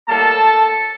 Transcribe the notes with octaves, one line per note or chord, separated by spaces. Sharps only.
A2 G3 A#3 A4 A5